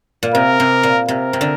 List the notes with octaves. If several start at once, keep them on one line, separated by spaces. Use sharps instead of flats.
A#2
C3 A#4
C3
A#2
C3 A#4
C3
D3